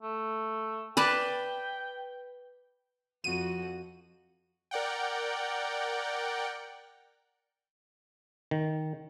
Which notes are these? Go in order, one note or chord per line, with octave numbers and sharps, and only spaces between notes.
A3
B4 D5 G5 A5
F2 F#4 D#7
A#4 D5 F#5 G5
D#3